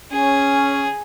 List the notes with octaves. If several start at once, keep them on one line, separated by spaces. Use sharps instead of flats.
C#4 G#4